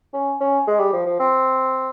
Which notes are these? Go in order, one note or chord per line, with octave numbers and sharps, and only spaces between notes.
C#4
C#4
G#3
G3
F3
F3
C4